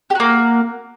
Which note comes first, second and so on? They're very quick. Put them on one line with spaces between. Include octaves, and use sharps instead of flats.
G4 F#4 A#3